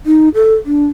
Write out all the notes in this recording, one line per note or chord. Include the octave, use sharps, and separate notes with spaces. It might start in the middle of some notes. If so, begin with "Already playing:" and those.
D#4
A4
D4